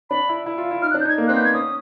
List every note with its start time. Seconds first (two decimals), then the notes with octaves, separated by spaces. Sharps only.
0.10 D4 B5
0.29 E4
0.46 E4
0.58 F4
0.71 E4
0.82 D#4 F6
0.91 F#6
0.94 D4
1.00 G6
1.05 D#4 G#6
1.18 A#3
1.27 C4 F#6
1.35 B3 G6
1.45 G#6
1.53 C#4 D#6